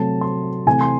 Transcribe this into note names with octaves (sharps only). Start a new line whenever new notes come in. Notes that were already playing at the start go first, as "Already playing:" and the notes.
Already playing: C3 F#3 A3 A5
C6
C3 E3 A3 G#5
C6